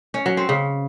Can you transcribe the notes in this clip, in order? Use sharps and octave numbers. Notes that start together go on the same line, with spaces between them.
C#4
F#3
C4
C#3